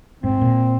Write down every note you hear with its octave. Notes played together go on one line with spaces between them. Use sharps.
G#2 C4
A#2